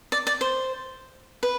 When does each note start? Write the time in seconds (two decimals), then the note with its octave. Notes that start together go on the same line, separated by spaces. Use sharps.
0.12 D5
0.27 D5
0.41 C5
1.43 B4